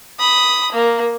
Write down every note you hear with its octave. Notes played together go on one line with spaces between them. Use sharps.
B5 D#6
A#3